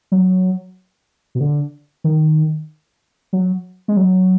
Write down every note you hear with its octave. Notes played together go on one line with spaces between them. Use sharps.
F#3
B2
D3
D#3
F#3
G#3
F#3